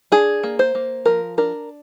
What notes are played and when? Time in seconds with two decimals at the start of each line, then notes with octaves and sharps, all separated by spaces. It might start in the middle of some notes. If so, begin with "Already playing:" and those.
0.12 D4 G#4
0.43 A#3
0.59 C5
0.75 A#3
1.06 F3 A#4
1.38 D4 A#4